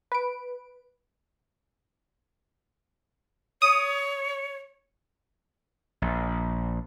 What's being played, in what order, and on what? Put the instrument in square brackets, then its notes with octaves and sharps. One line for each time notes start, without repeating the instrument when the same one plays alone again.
[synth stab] B4 D7
[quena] C#5 [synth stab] D#6
[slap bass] A#1